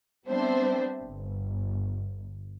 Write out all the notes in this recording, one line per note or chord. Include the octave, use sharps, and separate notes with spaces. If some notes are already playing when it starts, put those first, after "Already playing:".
G3 B3 C4 D4 C5 E5
G1